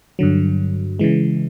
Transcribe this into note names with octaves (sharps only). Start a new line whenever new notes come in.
G2 D3 F#3
C#3 E3 G#3